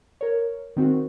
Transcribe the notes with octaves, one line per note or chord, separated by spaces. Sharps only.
A#4 C#5
D#3 C4 F#4